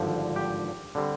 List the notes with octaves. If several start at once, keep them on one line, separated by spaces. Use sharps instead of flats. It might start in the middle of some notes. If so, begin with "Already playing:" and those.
Already playing: G#1 G2 D3 F3 G4
G4
D3 G3 C4